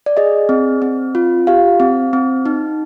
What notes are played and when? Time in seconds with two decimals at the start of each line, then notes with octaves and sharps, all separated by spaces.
0.06 D5
0.17 G#4 D#5
0.49 C4
0.82 C4
1.15 F4
1.47 G4 F5
1.80 C4
2.13 C4
2.46 D#4